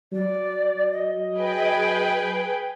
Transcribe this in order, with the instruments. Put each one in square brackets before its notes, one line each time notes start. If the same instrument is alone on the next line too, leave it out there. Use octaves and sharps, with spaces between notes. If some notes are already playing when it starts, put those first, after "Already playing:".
[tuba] F#3 [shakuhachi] D5
[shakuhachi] D#5
[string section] G#4 B4 G5